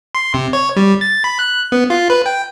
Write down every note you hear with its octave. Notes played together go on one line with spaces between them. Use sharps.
C6
C3
C#5
G3
A6
B5
F#6
B3
F4
B4
G5